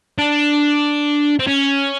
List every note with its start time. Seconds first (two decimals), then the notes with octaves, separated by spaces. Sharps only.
0.18 D4
1.39 C4
1.47 C#4